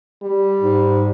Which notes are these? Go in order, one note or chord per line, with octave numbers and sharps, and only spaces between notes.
G3
G#2